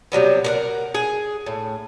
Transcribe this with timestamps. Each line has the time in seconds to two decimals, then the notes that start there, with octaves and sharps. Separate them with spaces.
0.12 C3 F#3 G3 B3
0.44 A#4 D5 F#5
0.94 G#4
1.46 A2